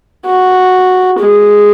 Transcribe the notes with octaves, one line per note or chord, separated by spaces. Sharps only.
F#4
G#3